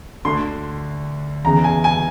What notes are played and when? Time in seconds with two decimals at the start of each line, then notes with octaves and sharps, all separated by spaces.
0.25 D2 D3 C6
1.44 E2 C#3 E3 A#5
1.64 G#5
1.84 G#5